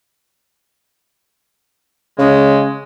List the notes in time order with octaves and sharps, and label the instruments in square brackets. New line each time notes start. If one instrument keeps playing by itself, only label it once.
[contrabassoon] C#3 [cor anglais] G#3